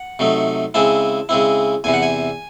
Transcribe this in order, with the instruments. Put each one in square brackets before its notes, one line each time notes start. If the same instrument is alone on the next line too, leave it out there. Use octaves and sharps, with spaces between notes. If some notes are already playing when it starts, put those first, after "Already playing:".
Already playing: [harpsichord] F#5
C3 F#3 A3 D#4
C#3 G#3 C4 E4 A5
C#3 G#3 C4 E4
E2 C3 E3 G#5
F#5
G#5